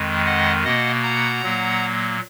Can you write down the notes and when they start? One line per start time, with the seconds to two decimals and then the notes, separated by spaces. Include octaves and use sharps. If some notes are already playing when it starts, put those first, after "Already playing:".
Already playing: F2 D#3 G#3
0.26 D#5 F#5
0.64 B2 A#3 D#5 F#5
1.03 F#5 A#5
1.42 A#2 F#3 A#3